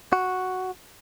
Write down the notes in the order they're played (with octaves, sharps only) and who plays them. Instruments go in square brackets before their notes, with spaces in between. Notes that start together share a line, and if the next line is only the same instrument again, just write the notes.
[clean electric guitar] F#4